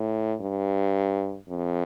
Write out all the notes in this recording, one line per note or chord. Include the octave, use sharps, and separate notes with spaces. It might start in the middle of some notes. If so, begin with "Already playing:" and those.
Already playing: A2
G2
F2